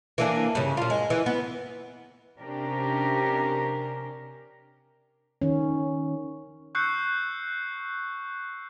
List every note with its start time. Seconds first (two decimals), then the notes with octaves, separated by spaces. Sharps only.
0.18 E3 A#3 D4
0.55 G2 C#3
0.77 A#2 F4
0.90 G#3
1.10 E3
1.26 B3
2.39 C3 C#4 D4 G4 A#4
5.42 D#3 C#4
6.75 C#6 E6 F#6 G6 C7 C#7